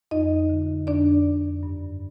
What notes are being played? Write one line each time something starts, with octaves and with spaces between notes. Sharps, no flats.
F2 D#4 D#5
D3
F2 D4 D5
F2
G2